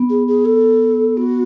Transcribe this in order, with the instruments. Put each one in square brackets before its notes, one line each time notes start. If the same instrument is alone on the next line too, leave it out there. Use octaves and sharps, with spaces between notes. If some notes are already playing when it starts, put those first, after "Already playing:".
Already playing: [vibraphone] B3
[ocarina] G#4
G#4
A4
[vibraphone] B3 [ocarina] F#4